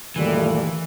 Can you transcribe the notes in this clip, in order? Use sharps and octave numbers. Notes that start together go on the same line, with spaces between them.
F#1 D2 A#2 D#3 E3 G3 A3